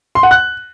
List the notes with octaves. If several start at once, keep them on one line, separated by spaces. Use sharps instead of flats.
C6
F#5
F#6